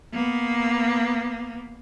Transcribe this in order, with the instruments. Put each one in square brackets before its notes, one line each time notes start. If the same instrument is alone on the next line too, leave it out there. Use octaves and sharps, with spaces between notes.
[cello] A#3 B3